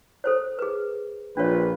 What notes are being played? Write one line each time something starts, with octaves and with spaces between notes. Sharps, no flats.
A4 C5 C#5
G#4 B4
A#1 D4 F4 B4 C#5